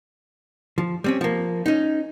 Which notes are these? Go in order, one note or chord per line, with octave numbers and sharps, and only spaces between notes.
F3
G3 C4 C#4
F3 A#3
C#4 D#4